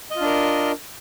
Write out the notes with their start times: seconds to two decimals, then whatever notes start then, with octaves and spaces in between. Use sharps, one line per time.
0.11 D#5
0.16 F4
0.21 D4
0.26 A#4